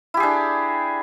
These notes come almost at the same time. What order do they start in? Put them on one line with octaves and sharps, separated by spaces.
E4 G4 G#4 D4